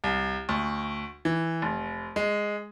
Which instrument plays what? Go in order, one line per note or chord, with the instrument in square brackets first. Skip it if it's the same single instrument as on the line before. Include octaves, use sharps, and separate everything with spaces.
[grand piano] C2
D2
E3
F1
G#3